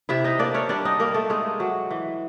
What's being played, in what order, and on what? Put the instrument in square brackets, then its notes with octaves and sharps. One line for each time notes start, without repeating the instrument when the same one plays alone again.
[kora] C3 E4 E5
D#4 D#5
A#3 D4 D5
C#4 C#5
G3 D4 D5
D#4 D#5
G3 A#3 A#4
A3 A4
G#3 A3 G#4
F#3
E3